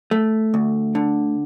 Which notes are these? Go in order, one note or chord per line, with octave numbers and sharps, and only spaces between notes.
A3
D2
D3